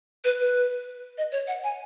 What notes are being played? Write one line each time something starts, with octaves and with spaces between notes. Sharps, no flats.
B4
B4
D#5
C#5
F#5
G#5